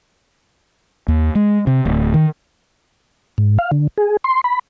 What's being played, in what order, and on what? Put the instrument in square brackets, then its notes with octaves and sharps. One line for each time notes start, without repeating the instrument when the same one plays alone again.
[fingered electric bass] D#2
G#3
C3
D1
D#3
[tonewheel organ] G#2
F5
D3
G#4
C6
B5